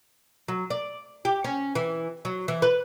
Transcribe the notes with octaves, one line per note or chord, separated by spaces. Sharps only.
F#3
D5
G4
C#4
E3
F#3
E3
B4